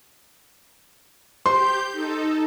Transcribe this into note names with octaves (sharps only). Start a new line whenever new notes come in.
G4 C5 C6 G6
D#4 A4